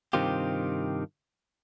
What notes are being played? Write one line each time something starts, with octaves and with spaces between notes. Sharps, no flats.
G2 C3 D#3 C4 F4 G4